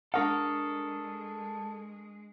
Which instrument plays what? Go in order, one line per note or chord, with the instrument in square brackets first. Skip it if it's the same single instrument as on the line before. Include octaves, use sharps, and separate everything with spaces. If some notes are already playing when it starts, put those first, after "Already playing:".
[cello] G#3 [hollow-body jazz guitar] D4 A#4 F#5 [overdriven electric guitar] A4 [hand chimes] C#6 D#6 F6